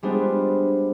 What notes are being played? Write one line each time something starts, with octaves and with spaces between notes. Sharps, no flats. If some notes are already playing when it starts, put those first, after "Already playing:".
G3 G#3 B3 D4 F4 C5